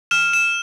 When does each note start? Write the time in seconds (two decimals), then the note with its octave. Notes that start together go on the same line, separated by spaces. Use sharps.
0.11 F6 E7
0.33 E7